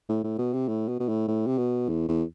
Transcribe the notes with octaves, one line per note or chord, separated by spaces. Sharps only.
A2
A2
B2
C3
A2
B2
B2
A2
A2
C3
B2
E2
E2